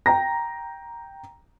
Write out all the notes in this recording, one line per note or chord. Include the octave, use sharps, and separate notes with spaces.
G5 A#5 A#6